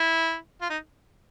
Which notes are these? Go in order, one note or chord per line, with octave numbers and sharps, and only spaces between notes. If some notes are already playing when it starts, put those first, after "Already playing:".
Already playing: E4
F4
D#4